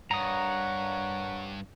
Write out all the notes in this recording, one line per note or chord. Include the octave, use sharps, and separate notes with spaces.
G2 A#4 C#5 F#5 A#5 D#6